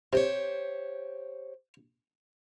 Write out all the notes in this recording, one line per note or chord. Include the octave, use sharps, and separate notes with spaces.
C3 G4 C5 C#5